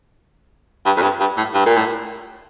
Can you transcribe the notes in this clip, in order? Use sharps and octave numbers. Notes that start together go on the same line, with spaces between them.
G2
F2
G2
G2
A2
G2
A#2
A2